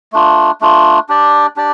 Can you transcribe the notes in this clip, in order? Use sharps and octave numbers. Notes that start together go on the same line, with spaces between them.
A3 D4 F4
A3 D4 F4
D4 G4 D5
D4 G4 D5